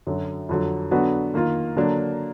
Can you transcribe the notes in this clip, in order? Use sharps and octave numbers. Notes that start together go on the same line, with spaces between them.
F#2 D3 F#3
F2 D3 F#3
D3 F#3 B3 D4 F#4
D#3 A#3 F4
D3 F#3 A#3 D4